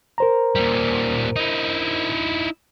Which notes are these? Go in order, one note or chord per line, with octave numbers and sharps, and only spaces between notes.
A#4 C5 A#5
A#2 G3
D#4 E4